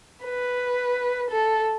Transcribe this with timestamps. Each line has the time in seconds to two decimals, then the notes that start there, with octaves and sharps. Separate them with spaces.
0.24 B4
1.30 A4